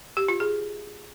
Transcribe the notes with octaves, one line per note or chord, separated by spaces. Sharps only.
G4
F4
G#4